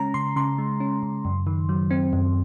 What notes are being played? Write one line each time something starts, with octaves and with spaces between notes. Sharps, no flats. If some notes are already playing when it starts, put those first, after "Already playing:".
Already playing: C#3 G#3 C#4 A#5
C#3 C6
C#3 C6
G#3
C#4
C#3
F#2
D#3
F#3
C4
F#2